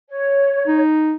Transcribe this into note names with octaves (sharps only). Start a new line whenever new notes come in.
C#5
D#4